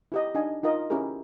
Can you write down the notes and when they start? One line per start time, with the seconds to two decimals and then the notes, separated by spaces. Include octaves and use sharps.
0.12 E4 G4 D#5
0.35 D4 D#4 D#5 G#5
0.63 D#4 F4 A#4 D#5
0.90 C#4 E4 G4 G#4 A#4